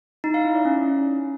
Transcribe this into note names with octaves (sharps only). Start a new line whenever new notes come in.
D#4
F5
E4
D5
C#4